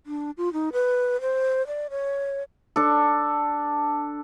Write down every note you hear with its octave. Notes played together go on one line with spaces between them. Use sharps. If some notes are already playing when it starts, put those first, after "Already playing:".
D4
F4
D#4
B4
C5
D5
C#5
D4 A4